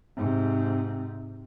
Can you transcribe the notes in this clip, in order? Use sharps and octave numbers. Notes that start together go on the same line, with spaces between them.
G#2 C3